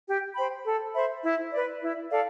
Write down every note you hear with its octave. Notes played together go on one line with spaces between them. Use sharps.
G4
C5 G5 B5
A4
C5 E5 B5
E4
B4 D5
E4
A4 D5 F5